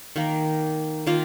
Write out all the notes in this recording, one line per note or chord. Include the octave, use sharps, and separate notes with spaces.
D#3 A#3
D#3 A#3 F4